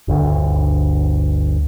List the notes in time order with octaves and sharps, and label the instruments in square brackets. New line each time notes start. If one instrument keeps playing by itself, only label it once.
[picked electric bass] G1 D2